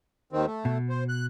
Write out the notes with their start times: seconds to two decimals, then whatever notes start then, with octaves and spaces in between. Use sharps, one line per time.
0.33 D#2 D#3 C4
0.46 A3
0.65 B2
0.89 C5
1.09 F#6